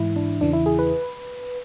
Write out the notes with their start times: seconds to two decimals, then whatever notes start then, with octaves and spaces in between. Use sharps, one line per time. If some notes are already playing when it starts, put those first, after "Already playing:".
Already playing: G#2 E3 E4
0.16 D4
0.41 E2 C#3 E3 D4
0.53 E4
0.66 G#4
0.79 B4